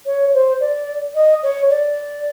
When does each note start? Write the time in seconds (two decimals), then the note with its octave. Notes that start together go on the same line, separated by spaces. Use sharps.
0.06 C#5
0.34 C5
0.60 D5
1.15 D#5
1.43 C#5
1.70 D5